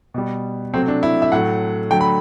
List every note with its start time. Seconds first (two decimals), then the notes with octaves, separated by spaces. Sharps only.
0.14 B2 G3
0.74 C3 F#3 A3 C4
0.88 D4
1.03 E4
1.22 E5
1.32 A2 F#3 A3 F#5
1.91 D3 F#3 A3 G5
2.01 B5